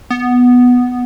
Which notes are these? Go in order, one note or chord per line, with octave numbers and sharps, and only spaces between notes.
B3